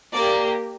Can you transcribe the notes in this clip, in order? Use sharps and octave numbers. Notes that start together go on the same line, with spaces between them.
A#3 G4 D5